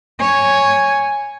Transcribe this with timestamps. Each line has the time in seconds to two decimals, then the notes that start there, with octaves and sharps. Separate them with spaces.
0.20 C#5 G#5